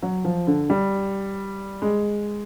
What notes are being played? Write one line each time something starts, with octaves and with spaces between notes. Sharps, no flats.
F#3
F3
D3
G3
G#3